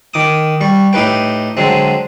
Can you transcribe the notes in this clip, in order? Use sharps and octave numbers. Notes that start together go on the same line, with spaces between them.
D#3 D6 D#6
G3 C#6
A2 D#4 G4 B4 G5
D3 F#3 G#3 C4